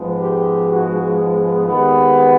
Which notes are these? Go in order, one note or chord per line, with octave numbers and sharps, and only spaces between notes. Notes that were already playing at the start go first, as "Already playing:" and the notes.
Already playing: G#2 F3 G#3 B3
G4
F#4
D#2 D#3 G#3 B3